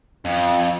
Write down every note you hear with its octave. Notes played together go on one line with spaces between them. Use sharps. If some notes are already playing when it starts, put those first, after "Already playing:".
F2